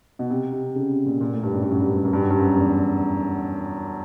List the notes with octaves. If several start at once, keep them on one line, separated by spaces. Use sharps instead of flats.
B2
C3
C3
C#3
C3
A#2
A#2
A2
G2
F#2
G2
F#2
G2
F#2
G2
F#2
G2
F#2
G2
F#2
E2